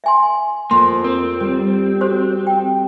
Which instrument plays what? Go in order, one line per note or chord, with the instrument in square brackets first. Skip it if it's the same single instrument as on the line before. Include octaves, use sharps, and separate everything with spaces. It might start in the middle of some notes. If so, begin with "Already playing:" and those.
[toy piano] E5 G#5 C6
[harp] F2 [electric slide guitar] A#3 [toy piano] C6
[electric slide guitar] C4 [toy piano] A#4
[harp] G3
[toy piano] F#4 A4 C5
G5